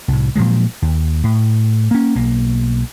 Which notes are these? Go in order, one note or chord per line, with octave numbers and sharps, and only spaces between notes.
C2 A2
A#2 F3 F#3 G#3
D#2
A2
A#3 C#4
B1 A#3